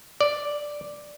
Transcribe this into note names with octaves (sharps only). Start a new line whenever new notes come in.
D5